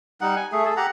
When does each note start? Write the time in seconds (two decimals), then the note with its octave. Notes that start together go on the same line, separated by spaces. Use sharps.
0.21 G3 D#4 F#5
0.36 G#5
0.52 A3 G#4
0.65 G#4 A4
0.77 G4 F#5 A#5